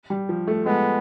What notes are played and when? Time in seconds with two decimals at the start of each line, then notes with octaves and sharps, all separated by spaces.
0.10 G3
0.29 F3
0.47 A3
0.66 G#3 B3